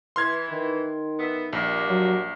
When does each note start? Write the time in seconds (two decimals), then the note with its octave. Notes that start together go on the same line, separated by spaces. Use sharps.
0.16 E3 C6 F6 G#6
0.51 D#3
1.19 B3 E5
1.53 A#1 G3 A#3
1.88 F#3